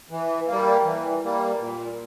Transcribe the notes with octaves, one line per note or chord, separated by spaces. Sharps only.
E3
G3 A#3
E3
G3 A#3
A#2